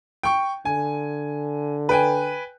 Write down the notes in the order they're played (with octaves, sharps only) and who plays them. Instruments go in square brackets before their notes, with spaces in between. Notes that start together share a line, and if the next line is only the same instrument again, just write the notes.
[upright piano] G5 C#6
[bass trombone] D3 [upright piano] G#5
[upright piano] B4 G5 G#5